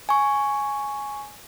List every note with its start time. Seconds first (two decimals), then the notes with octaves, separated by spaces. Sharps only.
0.09 G#5 C#6